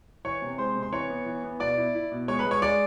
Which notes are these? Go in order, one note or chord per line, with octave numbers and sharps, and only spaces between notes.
E3 C#5 C#6
C3
G#3 C5 C6
C3
C6
E3 C#5 C#6
B3
E3
B3
B2 D5 D6
E4
E4
B2
G#3 C#5 C#6
B4 B5
G#3
C#5 C#6
G#3 D5 D6